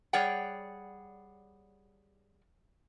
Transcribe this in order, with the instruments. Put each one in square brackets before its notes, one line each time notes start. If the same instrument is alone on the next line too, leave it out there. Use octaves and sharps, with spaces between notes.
[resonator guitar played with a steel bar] G3 G#4 C#5 D5 F#5 G5